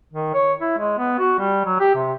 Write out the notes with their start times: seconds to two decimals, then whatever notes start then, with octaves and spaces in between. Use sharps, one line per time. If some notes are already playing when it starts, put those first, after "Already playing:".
0.13 D#3
0.34 C#5
0.60 E4
0.78 G#3
0.98 B3
1.19 F#4
1.39 G3
1.65 F#3
1.80 G4
1.95 C3